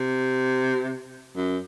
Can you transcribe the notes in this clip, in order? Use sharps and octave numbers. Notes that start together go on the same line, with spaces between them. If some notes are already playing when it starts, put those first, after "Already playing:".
Already playing: C3
F#2